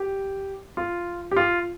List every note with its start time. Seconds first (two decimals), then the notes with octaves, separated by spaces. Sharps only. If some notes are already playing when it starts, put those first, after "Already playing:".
Already playing: G4
0.77 F4
1.31 G4
1.36 F4